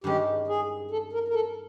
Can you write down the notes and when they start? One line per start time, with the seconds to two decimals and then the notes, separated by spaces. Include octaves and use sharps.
0.04 G2 D#3 G#3 C#4 G4
0.48 G#4
0.91 A4
1.13 A#4
1.28 A#4
1.34 A4